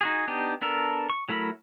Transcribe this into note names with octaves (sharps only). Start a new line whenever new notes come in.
D#4 F#4 G#4
B3 D4 D#4 G4
B3 D4 A4 A#4
C#6
F#3 A3 E4 A#4 B5